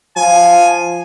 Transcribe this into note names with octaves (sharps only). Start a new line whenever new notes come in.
F3 G#5